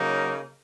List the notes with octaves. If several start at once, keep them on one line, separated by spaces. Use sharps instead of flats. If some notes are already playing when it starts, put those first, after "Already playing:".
Already playing: C#3 F#3 A#3 D#4